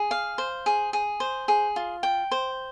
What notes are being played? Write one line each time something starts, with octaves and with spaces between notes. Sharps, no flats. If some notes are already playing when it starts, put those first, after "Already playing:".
Already playing: G#4
F5
C5
G#4
G#4
C5
G#4
F4
G5
C5